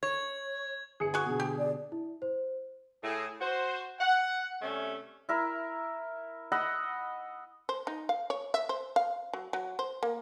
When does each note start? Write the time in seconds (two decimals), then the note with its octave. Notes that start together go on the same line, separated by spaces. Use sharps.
0.03 C#5 G#6
1.00 G1 G#4 C#7
1.14 F#4 G#5
1.26 B2 D3
1.40 G4
1.59 D5
1.92 E4
2.22 C5
3.03 A2 G#4
3.41 F#4 C5
4.00 F#5
4.62 C3 G3 A3 C#4
5.29 E4 A#4 E5
6.52 D#5 F#5 B5 E6
7.69 C5
7.87 D#4
8.09 F5
8.30 C#5
8.54 E5
8.69 C5
8.96 F5
9.33 F#3
9.53 F#3
9.79 C5
10.03 A#3